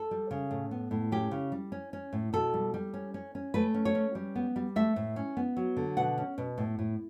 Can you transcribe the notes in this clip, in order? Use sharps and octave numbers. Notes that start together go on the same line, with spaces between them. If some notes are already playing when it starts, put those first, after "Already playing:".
Already playing: A4
G3
C#3
A2
B3
A2
C#4 G4
C#3
G3
C#4
C#4
A2
B2 A4
G3
G3
C#4
C#4
C#4
A3 B4
C#4
C#5
C#4
G3
B3
G3
A3 E5
A2
C#4
B3
F#3
D3
B2 F#5
C#4
B2
A2
A2